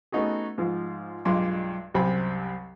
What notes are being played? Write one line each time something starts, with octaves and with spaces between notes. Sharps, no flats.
A3 B3 C#4 D#4 F#4 G#4
G#2 F3
B1 G2 G#3 F4 C6 D6
C2 F#2 C3 C4 G#5 B5